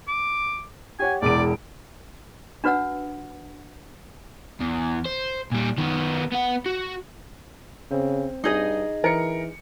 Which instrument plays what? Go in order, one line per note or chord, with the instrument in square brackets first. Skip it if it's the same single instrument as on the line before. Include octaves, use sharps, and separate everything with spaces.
[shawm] D6
[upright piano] G4 C#5 F#5 [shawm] G#5
[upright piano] E1 E2 D7 [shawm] D5
[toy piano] D4 F#4 B4 C#5 F#5 E6
[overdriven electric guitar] E2
C5
A#2 G3
D#3 B3
B3 F#5
F#4
[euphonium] C#3 [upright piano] C4
[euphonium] G2 [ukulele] D#4 G#4 D#5
[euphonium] E3 [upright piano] A#4 C#7